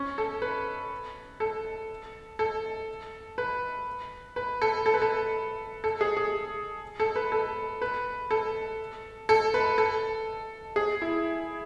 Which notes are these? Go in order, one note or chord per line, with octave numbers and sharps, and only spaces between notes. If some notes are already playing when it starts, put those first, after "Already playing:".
Already playing: C#4
A4
B4
A4
A4
B4
B4
A4
A4
B4
A4
A4
G#4
G#4
A4
B4
A4
B4
A4
A4
B4
A4
G#4
E4